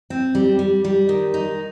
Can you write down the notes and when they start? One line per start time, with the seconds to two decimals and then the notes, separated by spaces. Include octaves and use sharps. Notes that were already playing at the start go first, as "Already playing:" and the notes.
0.10 C4
0.35 G3
0.59 G3
0.84 G3
1.09 D#3
1.34 D#4